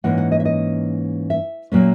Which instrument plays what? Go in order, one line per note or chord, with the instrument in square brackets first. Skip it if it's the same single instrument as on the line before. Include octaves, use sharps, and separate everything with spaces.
[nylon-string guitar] G#2 E3 A#3 C#4 F#5
F#5
D#5
E5
D#5
E5
A#2 F#3 A#3 C#4